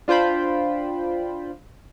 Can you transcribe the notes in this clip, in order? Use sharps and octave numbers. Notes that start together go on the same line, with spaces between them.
D4 F4 C5 G5 B5